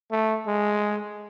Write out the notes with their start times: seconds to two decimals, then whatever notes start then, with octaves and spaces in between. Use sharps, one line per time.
0.11 A3
0.47 G#3